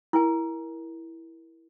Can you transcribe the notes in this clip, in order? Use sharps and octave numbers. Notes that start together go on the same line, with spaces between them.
E4 A#4 G#5